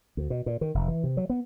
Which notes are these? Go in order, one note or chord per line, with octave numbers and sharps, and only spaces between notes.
D2
B2
A#2
D#3
F1
E3
C3
F#3
B3